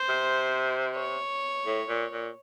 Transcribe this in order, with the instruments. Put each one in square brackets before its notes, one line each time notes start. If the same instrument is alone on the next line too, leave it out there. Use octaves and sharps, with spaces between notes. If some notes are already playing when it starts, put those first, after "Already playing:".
Already playing: [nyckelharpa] C5
[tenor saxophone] C3
[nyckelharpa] C#5
[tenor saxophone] A2
A#2
A#2